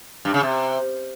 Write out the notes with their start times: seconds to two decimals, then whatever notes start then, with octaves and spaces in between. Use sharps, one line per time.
0.25 G2
0.34 C#3
0.43 C3